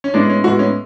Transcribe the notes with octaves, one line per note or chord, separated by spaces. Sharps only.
C#4
A2 G#3 B3 D4
C#4
A2 G#3 B3 F#4
C#4